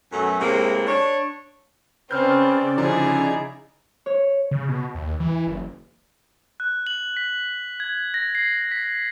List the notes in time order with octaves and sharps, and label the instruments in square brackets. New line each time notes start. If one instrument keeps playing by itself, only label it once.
[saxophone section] F#2 B2 F#3 A3
A2 C3 G#3 A#3
D4 C#5
[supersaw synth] C#3 D5 [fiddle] C4 C#4 [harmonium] B4 [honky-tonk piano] F6 G6
[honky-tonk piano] D3 F3 [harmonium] D#4 A#5 [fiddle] E4 G#4
[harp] C#5
[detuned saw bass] C#3
B2
D#2
E3
F#1
[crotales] F#6
F#7
B6
G#6
A#6
C7
B6